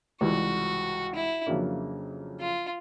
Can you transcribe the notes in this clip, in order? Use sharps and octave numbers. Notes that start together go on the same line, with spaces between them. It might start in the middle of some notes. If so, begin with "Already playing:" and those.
C#2 C3 E3 G3 F#4
E4
F2 C#3 F#3 A#3 D4
F4